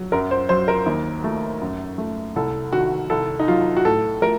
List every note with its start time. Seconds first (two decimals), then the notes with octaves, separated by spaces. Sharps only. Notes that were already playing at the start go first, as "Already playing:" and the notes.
Already playing: F#3
0.12 F#2 A#4
0.31 C5
0.49 F#3 C5
0.68 A#4
0.86 D#2
1.24 A3
1.61 F#2
1.98 A3
2.36 C2 A4
2.73 D#3 F#4
3.10 C2 A4
3.40 D#4
3.48 F#3 F4
3.77 F#4
3.85 A2 A4
4.22 A3 A#4